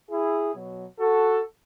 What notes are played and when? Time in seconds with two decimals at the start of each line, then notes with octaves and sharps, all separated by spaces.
0.10 E4 G#4
0.54 B2 F#3
0.99 F#4 A4